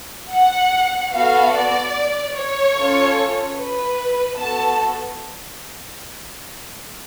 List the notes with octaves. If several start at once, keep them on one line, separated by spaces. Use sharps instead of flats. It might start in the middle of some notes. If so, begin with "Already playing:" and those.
F#5
B3 F#4 A4 F5
D5
C#5
C#4 F4 A4
B4
B3 F#4 A4 A5